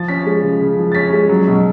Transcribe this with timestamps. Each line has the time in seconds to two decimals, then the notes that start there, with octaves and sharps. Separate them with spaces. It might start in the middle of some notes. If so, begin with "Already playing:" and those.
Already playing: F3 A6
0.08 C#4 B6
0.26 G#3
0.43 C#3
0.61 C#3
0.78 F3
0.92 A6
0.95 C#4 B6
1.13 G#3
1.29 F#3
1.48 B2